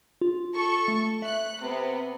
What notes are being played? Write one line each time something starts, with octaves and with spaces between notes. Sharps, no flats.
F4
A4 C#6
A3
E5 F#6
C3 B3